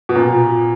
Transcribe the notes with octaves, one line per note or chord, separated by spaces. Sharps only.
B2
A#2